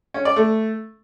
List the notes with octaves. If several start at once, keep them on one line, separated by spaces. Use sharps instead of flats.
C#4
D5
A3